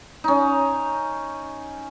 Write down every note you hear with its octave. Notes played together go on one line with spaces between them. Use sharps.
C#4 D#4